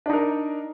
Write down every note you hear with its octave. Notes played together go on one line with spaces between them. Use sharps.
D4 D#4 A#4